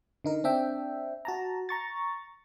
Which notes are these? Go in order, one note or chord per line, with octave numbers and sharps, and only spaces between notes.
D3 D#4 A#4
C4 D4 E5 G5
F#4 A5 A#5
A#5 C#6 A6